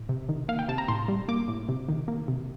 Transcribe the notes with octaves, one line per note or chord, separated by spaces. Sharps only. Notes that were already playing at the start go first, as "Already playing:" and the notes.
Already playing: A2
C3
D#3
A#3 F5
G5
C3 A5
A#5
A2 C6
G3
A#3 D6
A2
C3
D#3
A#3
C3